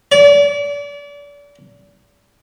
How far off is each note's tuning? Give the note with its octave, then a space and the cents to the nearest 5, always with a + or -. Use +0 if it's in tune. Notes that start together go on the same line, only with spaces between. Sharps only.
D5 -35